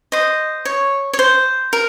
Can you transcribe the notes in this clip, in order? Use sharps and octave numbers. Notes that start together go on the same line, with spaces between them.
C5 D#5
C#5
C#5
C5
A#4